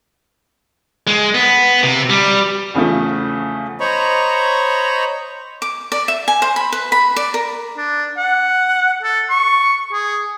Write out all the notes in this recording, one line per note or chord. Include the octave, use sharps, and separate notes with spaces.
G#3
B3
C3
G3
E2 C#3 F3 A3
C5 C#5 D#5 A#5 B5 C#6
D6
D5
E5
G#5
C5
B5
B4
B5
D5
A#4
D4
F#5
A4
C#6
G#4